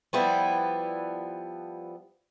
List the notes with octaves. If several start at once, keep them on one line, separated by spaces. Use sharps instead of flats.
F3 G3 B3 E4